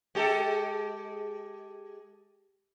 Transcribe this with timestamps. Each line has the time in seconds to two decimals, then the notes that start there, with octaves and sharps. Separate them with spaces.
0.15 G#3 G4 A4